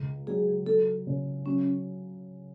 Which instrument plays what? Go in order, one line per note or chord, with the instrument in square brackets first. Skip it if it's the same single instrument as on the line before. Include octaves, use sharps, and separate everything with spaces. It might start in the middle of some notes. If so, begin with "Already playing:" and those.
Already playing: [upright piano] C#2
[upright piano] F#3 [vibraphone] G#4
[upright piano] F#3 [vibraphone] A4
[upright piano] C#3
[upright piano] F#3 [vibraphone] C#4